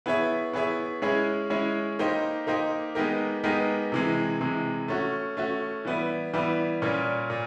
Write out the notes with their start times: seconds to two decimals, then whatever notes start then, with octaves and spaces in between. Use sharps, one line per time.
0.06 B3 E4 G#4 C#5 E5
0.53 B3 E4 G#4 C#5 E5
1.02 G#3 C#4 E4 G#4 C#5
1.50 G#3 C#4 E4 G#4 C#5
1.99 A#3 D#4 G4 C5 D#5
2.47 A#3 D#4 G4 C5 D#5
2.95 G#3 B3 D#4 G4 A#4
3.44 G#3 B3 D#4 G4 A#4
3.92 C3 E3 G#3
4.41 C3 E3 G#3
4.88 A3 C#4 F#4
5.37 A3 C#4 F#4
5.85 E3 G3 B3 E4
6.33 E3 G3 B3 E4
6.82 A#2 G3 A#3 C#4
7.30 A#2